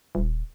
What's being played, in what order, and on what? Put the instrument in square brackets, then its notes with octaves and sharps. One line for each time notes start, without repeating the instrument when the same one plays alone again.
[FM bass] D#1